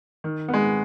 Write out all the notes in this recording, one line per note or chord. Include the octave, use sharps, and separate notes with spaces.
D#3
G#3 B3